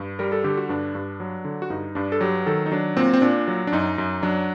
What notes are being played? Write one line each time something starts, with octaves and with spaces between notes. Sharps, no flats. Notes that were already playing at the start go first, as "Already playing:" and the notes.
Already playing: G2
G3 A#4
A4
D3 G4
F#4
G2 D4
G2
F#3
D3
F#4
G2 D#4
G2 D4
A4
F#3 G4
D#3 A4
D#4
F#3 D4
A#2 C4
C4
A#2 D4
F#3
D4
F#2 D#4
F#2
F#3 D4